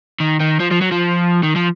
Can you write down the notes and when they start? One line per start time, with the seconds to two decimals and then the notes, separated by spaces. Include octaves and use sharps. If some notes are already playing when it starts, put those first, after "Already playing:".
0.20 D#3
0.40 D#3
0.60 F3
0.71 F3
0.81 F#3
0.92 F3
1.43 D#3
1.56 F3